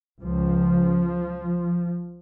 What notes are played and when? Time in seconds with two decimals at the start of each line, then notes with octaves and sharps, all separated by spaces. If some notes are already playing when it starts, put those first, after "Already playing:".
0.22 C#2 C#3 F3